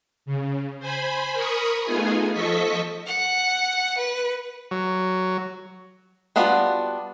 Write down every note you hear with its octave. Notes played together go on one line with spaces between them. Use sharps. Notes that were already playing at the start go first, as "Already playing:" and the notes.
C#3
C5 G#5 B5
A#4 B5 C#6 D#6
A3 B3 D#4 F4 G#4 G#5
F3 A4 D#5 C#6 B6
F#5
B4
F#3
G3 B3 D4 F4 F#4